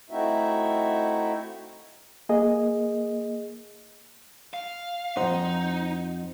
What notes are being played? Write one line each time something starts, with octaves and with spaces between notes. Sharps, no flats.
A3 C4 D#4 E4 F#4 E5
A#3 G#4 D#5
F5
F2 D#4 C5 D#5 F#5